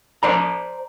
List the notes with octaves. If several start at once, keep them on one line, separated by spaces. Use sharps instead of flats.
C5 D5 A#5